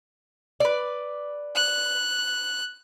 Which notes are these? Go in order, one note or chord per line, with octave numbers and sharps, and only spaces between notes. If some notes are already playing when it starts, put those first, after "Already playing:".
B4 D5
F#6